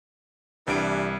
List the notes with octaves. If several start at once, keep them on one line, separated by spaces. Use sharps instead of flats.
C2 E3 G3 D4 D7